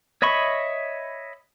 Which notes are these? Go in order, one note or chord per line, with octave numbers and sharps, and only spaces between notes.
C#5 D#5 E5 B5 C#6